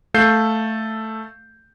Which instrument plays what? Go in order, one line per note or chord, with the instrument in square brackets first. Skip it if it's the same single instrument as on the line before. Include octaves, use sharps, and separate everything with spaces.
[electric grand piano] A3 A4 F5 G6 C7